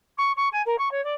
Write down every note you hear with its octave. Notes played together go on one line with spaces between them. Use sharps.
C#6
C#6
G#5
A#4
C#6
C#5
D5